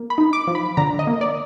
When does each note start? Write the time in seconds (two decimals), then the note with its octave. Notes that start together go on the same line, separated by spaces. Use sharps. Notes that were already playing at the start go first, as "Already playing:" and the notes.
Already playing: A#3
0.10 B5
0.18 D#4
0.33 D6
0.47 F3
0.55 B5
0.77 D3 A#5
0.99 D#5
1.07 A#3
1.21 D5